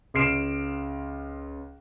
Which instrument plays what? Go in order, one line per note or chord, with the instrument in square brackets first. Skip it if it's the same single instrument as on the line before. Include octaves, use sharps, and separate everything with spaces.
[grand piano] C#2 C6 F6 C7 D7 E7